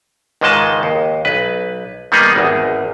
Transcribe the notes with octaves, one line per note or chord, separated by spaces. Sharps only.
C#2 G#2 D#3 G#3 D#5 A5
D#2
B1 B4
D#3 G3 A#3 B3 D#4 G#4
G#1 E2